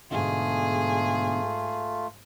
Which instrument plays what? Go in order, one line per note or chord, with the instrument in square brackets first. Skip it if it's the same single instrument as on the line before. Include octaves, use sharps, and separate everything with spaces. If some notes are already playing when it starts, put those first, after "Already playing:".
[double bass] G#2 [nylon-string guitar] B2 D3 [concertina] A3 F4 [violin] G#4